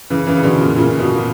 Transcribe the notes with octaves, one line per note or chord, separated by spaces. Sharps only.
C#3 E3
C#3 E3
C#3
B2 D3
A#2 C#3
A#2 C#3
B2
A#2